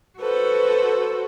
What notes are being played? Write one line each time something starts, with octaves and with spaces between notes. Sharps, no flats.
F#4 A4 B4 C5